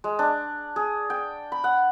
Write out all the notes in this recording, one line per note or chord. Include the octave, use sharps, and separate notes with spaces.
G#3
D4
G#4
G5
B5
F#5